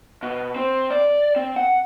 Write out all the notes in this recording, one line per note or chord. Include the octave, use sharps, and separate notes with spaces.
B2
C4
D5
C4
F#5